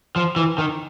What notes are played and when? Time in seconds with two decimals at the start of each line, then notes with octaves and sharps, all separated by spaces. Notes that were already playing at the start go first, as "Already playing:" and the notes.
0.16 F3
0.36 E3
0.58 D#3